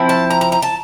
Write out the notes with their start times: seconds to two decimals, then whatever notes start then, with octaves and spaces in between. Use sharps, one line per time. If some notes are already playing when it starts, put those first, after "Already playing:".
Already playing: F3 C4 E4
0.09 A5
0.30 A#5
0.41 A#5
0.52 A#5
0.62 A5